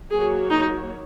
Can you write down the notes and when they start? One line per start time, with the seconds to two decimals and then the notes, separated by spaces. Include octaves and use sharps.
0.11 F#3 A#3 F#4 G#4 C#5
0.50 D#4